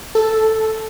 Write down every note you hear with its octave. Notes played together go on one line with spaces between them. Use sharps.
A4